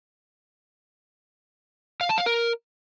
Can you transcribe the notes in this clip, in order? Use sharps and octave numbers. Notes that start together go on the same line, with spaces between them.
F5
A5
F5
A#4